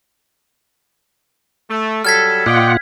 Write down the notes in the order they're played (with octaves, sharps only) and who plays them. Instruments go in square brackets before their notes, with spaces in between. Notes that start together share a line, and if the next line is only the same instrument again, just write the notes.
[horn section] A3
[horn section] F#3 G3 A4 [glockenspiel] F6 G#6 B6
[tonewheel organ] A#2 F4 F#5 [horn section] D5 D#5 G5